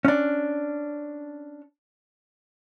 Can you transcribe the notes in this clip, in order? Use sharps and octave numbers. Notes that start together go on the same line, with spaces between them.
C#4 D4